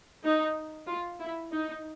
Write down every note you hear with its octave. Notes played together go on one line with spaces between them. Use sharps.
D#4
F4
E4
D#4